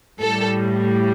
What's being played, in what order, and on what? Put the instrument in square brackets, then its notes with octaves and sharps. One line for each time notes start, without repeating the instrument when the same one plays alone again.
[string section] A2 G3 A4